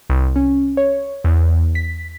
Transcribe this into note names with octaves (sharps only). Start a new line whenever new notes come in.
C2
C#4
C#5
E2
B6